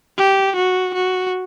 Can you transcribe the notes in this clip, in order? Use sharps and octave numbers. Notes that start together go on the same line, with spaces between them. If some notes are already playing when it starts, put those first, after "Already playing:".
G4
F#4
F#4